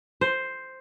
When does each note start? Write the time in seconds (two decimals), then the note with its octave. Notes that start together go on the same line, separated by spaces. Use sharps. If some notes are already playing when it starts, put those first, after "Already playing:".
0.21 C5